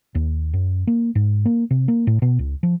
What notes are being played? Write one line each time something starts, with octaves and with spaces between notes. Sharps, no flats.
D#2
F#2
A#3
G#2
A#3
C3
A#3
A2
B2
C#2
F3